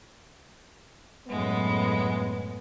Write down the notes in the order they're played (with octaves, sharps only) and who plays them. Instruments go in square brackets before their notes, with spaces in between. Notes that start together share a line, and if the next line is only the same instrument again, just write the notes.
[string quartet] F#2 A2 G#3 [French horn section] B3